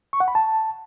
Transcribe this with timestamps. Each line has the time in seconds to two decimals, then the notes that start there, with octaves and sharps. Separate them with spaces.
0.13 C#6
0.20 F#5
0.28 B5
0.35 A5